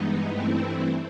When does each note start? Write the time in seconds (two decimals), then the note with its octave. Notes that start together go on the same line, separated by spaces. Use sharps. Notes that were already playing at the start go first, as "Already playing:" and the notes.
Already playing: G2 E3 G#3 B3 D#4
0.29 G2 E3 A3 C4 E4